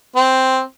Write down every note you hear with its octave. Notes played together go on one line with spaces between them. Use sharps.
C4